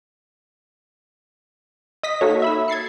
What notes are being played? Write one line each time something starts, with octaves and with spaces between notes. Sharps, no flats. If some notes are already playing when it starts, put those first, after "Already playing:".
D#5 D#6 A#6 B6
A#3 D#4 F#4 A4 C#5
E5 B5 E6
G#6 A6 C7 C#7